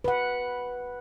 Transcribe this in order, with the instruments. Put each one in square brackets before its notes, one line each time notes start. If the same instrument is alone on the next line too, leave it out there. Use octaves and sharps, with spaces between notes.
[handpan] B4 F#5